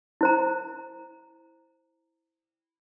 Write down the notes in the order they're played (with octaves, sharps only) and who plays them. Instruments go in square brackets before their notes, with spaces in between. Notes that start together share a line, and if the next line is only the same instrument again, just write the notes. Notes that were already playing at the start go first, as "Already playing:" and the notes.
[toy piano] E4 C5 A#5